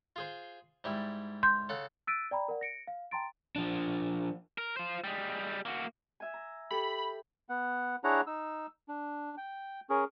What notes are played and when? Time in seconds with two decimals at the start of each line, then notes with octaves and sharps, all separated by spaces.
0.16 F4 G#4 C5
0.84 G#2 G3 E4
1.43 C6 G6
1.69 C#3 A4 F#5
2.07 E6 F#6 A6 B6 D7 D#7
2.31 D5 G5 A#5 B5
2.48 A#4 D5 F#5
2.61 A#6 C#7 D7
2.87 F5
3.11 G5 A5 A#5 C6 A6 D7
3.56 F3 D4
4.58 A#4
4.77 F4 C5
5.04 G3 G#3
5.66 A#3 F#4
6.20 E5 G#5
6.34 A#5
6.71 G4 A4 B5
7.49 B3 F#5
8.04 D4 E4 G#4 C#5 F#5 A#5
8.27 D#4 E6
8.89 D4
9.38 G5
9.90 C#4 G#4 A#4